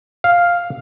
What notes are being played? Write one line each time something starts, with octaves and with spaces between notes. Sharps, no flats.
F5